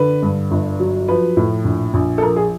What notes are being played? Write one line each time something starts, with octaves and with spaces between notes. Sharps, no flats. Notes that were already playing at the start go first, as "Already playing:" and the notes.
Already playing: D3 B4
G2
G1
F#3
F3 B4
A2
A#1
A#1
A4
F3 A#4
G#4